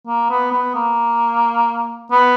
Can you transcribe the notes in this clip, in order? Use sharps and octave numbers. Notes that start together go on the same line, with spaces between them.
A#3
B3
B3
A#3
B3